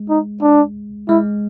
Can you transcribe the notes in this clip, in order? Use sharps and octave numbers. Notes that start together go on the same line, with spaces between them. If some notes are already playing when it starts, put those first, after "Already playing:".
Already playing: G#3
D#4
D4
G#3 E4